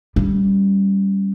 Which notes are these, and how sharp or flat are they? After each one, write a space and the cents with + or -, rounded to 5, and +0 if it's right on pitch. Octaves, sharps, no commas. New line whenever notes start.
G3 +0 C#4 +0